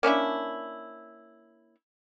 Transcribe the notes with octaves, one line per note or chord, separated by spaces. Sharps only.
A#3 C#4 D4 E4